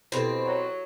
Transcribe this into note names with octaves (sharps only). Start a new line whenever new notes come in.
B2 C4 E4 G4 A4
F#3 A#5